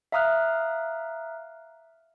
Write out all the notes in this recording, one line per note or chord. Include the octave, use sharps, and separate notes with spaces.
E5 F5 A#5 D#6 F6 F#6